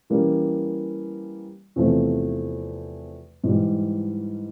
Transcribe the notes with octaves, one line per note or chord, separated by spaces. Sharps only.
E3 G3 A#3 C#4
E2 C3 F3 A3 C4
G#2 E3 G3